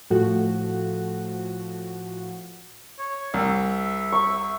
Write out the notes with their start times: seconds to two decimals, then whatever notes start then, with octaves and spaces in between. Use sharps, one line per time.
0.10 A2 F3 A3 F#4
2.99 C#5
3.34 C2 E5
4.12 C#6